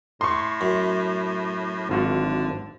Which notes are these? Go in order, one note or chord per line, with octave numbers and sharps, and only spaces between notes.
A2 C6 C#6
F#2
G#1 D3 F4 F#4